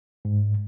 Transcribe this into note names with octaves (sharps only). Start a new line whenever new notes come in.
G#2